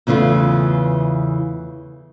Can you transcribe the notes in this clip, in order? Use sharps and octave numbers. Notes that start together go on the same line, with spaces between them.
E2 C#3 E3 A3 F4